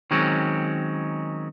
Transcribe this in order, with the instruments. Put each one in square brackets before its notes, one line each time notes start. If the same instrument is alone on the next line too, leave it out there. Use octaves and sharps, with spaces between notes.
[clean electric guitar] D#3 F#3 G#3 C4 C#4